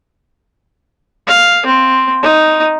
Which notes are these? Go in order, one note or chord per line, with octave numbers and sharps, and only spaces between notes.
F5
C4
D#4